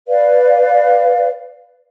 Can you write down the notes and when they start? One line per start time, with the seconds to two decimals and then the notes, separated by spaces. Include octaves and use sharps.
0.07 B4 D5 F5